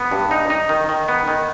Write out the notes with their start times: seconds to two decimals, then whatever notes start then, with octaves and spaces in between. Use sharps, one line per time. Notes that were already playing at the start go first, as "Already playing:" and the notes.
Already playing: B3
0.11 G2
0.31 D#4
0.50 D#4
0.69 D#3
0.89 D#3
1.08 B3
1.28 D#3